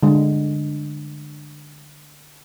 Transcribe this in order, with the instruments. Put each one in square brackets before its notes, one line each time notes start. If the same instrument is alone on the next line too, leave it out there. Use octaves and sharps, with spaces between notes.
[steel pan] D3 G#3